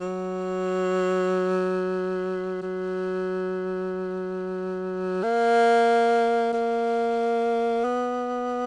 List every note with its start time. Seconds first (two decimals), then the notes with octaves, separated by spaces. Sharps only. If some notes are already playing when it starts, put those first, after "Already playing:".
0.01 F#3
2.62 F#3
5.23 A#3
6.53 A#3
7.84 B3